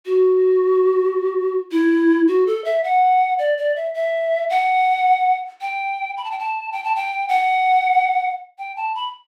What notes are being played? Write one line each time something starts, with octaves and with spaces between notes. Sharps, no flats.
F#4
E4
F#4
A4
E5
F#5
D5
D5
E5
E5
F#5
G5
B5
A5
G5
A5
G5
A5
G5
F#5
G5
A5
B5